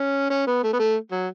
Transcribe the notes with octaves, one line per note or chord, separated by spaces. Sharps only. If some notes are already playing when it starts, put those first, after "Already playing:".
Already playing: C#4
C#4
B3
A3
B3
A3
F#3